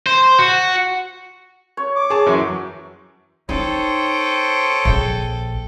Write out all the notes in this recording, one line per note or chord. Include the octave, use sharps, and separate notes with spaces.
C5
F#4
C#5
D6
G#4 C#5 A5
F#2 E3 F#3
D#4 A4 C5 C#5 G5 D#6
A#1 F3